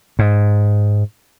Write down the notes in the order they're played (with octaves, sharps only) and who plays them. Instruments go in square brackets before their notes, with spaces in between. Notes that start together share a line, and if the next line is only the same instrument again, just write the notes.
[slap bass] G#2